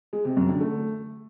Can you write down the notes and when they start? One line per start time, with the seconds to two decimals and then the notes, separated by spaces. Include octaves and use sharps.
0.13 G#3
0.25 C3
0.37 F#2
0.49 D3
0.61 A3